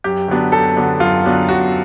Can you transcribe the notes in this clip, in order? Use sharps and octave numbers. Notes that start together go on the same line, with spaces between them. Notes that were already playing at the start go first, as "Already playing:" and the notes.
F#2 G4
D3 F#3 B3 D4
F#2 A4
D3 F#3 B3 D4
F#2 F4
D3 F#3 B3 D4
F#2 F#4